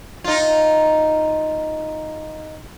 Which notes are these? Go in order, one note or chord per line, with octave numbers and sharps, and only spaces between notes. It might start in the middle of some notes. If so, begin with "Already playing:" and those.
D#4 F4